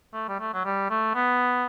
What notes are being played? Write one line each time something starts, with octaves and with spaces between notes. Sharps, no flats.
A3
G3
A3
F#3
G3
A3
B3